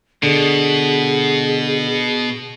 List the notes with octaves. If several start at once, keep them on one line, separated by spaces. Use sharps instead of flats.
B2 D3 G#4